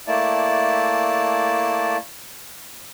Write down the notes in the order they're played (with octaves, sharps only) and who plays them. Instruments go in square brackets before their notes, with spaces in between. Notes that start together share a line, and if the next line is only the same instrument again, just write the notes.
[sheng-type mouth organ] A3 A#3 E4 D5 A5